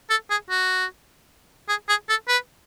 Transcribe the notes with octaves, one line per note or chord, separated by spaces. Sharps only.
A4
G#4
F#4
G#4
G#4
A4
B4